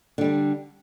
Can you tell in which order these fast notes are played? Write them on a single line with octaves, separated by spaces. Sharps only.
D3 G3 D4